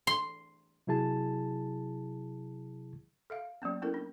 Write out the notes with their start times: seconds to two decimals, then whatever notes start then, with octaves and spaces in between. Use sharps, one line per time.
0.07 C6
0.87 C3 F#3 E4 G#4 A5
3.30 A4 E5 F5
3.62 F#3 A#3 B3 C#4
3.82 B3 C#4 E4 A4 A#4
3.94 B3 D4